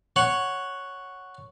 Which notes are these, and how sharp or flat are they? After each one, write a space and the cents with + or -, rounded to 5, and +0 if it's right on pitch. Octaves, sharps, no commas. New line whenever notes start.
C#5 +0 F#5 +0